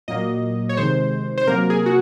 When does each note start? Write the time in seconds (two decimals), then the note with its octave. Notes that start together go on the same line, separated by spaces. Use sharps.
0.08 A#2 F#3 A#3 D#5
0.69 C#5
0.77 C3 D#3 G#3 C5
1.38 C5
1.47 C3 F#3 A#3 A#4
1.70 G#4
1.86 F#4